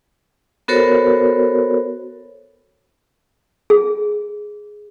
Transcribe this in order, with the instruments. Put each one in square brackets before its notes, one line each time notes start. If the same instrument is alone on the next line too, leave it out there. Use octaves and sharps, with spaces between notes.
[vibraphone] B3 F#4 A4 A#4 C5 C#5
[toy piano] G#4